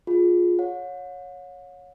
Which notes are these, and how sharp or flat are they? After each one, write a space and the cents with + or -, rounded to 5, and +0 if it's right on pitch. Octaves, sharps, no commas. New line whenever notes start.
F4 +15 G#4 +10
C#5 +0 F#5 -45